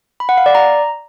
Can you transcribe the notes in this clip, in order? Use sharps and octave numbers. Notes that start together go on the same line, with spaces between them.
B5
F#5
F5
D5
A#5